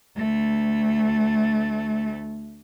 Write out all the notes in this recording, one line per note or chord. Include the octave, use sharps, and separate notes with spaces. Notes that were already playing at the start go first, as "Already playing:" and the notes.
D2 A3